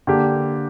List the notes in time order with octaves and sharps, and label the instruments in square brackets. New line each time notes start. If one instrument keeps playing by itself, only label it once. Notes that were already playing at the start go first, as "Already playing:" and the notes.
[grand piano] D3 A#3 G4